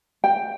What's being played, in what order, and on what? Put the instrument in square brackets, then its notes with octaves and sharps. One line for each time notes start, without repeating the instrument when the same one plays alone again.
[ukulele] G5